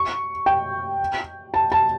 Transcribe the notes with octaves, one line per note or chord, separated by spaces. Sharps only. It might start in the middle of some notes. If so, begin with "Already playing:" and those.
Already playing: C#6
G5
A5
A5